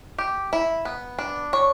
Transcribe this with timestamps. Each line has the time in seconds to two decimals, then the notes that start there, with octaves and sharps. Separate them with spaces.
0.18 G4
0.53 E4
0.85 B3
1.19 D4
1.53 C#5